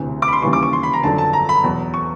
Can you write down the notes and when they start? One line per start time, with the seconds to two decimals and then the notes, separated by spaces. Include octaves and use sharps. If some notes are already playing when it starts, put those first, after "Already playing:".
Already playing: E1 D2 C3 E3
0.22 D6
0.28 B5
0.33 C6
0.42 D#2 C#3 E3 G3 C#6
0.53 D6
0.63 C#6
0.73 C6
0.83 B5
0.93 A#5
1.03 G1 F2 D3 F#3 A5
1.18 A5
1.33 A#5
1.49 B5
1.64 E2 B2 F#3
1.94 C#6